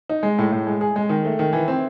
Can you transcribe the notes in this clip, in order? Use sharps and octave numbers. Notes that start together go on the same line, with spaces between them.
D#4
G#3
A2
A2
G#3
G#4
G#3
D#3
A3
D#3
E3
C4